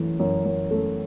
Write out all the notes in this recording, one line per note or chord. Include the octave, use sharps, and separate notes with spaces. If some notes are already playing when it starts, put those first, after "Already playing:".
Already playing: F#2 E3 A3
F#2
F#2
A3